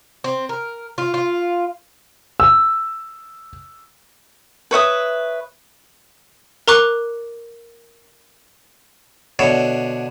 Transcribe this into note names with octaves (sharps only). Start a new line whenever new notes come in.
C4
A#4
F4
F4
E6
B4 C#5 E5 D#6
A#4 A#5 C#6 D6 F#6
B2 D3 C#5 E5